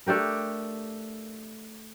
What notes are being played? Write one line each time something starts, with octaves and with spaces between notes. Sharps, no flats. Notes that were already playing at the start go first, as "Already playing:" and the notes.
A3 D4 G4 A#4